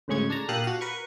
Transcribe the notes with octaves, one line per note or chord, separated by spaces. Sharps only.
D2 A2 C#3 G#3 C#6 G#6
D4 A5 A#5
A#2 G4 A4 F5 D#6 F#6
F#4 F5
A#4 B4 C#6